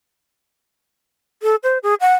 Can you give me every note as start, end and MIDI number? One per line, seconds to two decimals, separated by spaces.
1.43 1.56 69
1.63 1.78 72
1.83 1.95 68
2.01 2.14 78